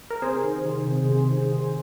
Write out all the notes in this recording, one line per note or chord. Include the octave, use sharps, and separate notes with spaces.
A#4
C3 G#4 C5
D#3
D#3
C3
C3
D#3
D#3